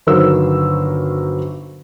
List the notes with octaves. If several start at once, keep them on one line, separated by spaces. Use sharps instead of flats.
G1 D#3 F#3 A#4 C5 E6